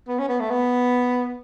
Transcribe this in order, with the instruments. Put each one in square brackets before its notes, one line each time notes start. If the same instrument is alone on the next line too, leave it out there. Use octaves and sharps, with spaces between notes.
[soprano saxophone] B3
C#4
B3
A3
B3